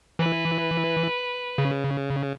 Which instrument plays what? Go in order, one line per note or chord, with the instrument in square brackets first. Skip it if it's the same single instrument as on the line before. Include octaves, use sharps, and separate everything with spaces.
[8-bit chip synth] E3 [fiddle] B4
[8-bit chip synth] C#3